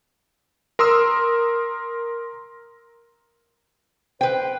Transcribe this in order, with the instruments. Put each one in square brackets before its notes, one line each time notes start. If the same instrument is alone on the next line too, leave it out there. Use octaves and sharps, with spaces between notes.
[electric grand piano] A#4 C6 D#6 E6
[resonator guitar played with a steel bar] B4 G5 [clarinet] C5